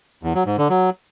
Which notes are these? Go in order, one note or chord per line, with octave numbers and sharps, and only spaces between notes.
E2
F#3
G#2
D3
F#3